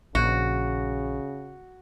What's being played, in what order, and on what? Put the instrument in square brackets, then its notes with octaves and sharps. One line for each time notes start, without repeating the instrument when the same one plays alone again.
[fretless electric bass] A#1 [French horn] C#3 [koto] F#4